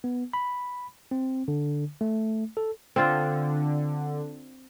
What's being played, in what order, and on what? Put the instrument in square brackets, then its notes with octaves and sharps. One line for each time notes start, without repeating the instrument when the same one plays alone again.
[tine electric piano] B3
B5
C4
D3
A3
A4
[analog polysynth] D3 [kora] C4 F4